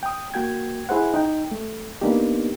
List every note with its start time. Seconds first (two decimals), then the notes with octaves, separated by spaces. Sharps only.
0.03 G5 D#6
0.34 A#3 F#4 G5 G#6
0.89 E4 G#4 C5 F#5
1.14 D#4 G5
1.51 A3
2.01 A#3 B3 D4 D#4 G4